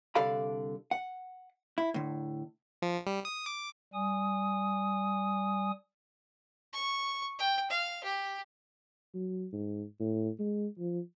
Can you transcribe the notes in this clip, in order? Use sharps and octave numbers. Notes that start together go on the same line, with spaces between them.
C2 D3 A4 D5 F5 B5
F#5
E4
A2 D3
F3
G3
D#6
D6
G3 G#5 D#6
C#6
G5
F5
G4
F#3
G#2
A2
G#3
F3